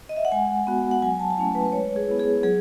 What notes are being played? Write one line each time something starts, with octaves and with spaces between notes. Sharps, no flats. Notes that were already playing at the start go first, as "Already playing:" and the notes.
D#5
E5
F#5
G#3 G#5
B3 F#4
F#5
F#3 G#5
A5
A5
A3 C#4 E4 G#5
B4
B4
G#3 C#5
G#4
B3 E4
G#4
F#3 G#4